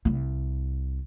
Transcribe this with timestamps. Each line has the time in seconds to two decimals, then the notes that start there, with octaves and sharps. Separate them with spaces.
0.05 C2 E4